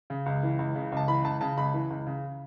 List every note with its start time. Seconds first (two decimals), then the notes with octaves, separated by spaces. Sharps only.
0.10 C#3
0.26 C#2
0.43 E3
0.59 C#2
0.75 C#3
0.92 C#2 A5
1.08 E3 B5
1.24 C#2 A5
1.41 C#3 A5
1.57 C#2 B5
1.74 E3
1.90 C#2
2.07 C#3